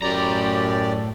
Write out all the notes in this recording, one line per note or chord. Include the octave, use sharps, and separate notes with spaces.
F#2 A2 G4 D5 A#5